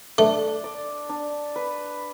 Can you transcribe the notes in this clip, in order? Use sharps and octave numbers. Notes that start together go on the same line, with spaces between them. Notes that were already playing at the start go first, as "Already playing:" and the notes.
A3 D4
D5
D4
B4